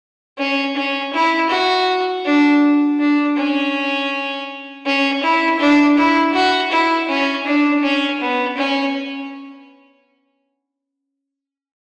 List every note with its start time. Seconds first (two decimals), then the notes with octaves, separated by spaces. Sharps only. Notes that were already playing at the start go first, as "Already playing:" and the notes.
0.38 C#4
0.76 C#4
1.13 E4
1.50 F#4
2.25 D4
2.99 D4
3.37 C#4
4.86 C#4
5.23 E4
5.60 D4
5.97 E4
6.34 F#4
6.71 E4
7.08 C#4
7.46 D4
7.83 C#4
8.20 B3
8.57 C#4